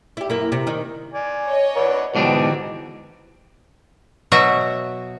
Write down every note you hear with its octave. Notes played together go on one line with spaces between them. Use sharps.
E4 G4
F#2 A#3 E4
C3
D#3 D#4
D5 G#5
C#5 D#5
B4 D5 F#5
G#2 B2 D3 E3 D4 D#4 F#4 G4
B2 F#3 F#4 E5